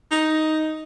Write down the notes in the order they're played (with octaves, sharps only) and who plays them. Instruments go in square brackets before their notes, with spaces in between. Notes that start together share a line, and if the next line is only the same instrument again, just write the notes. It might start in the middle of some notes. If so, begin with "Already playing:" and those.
[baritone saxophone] D#4